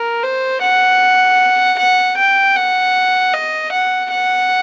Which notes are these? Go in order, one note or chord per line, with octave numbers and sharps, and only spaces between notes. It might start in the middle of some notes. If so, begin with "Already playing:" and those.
Already playing: A#4
C5
F#5
F#5
G5
F#5
D#5
F#5
F#5